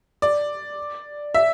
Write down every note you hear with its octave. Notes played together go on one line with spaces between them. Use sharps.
D5
E5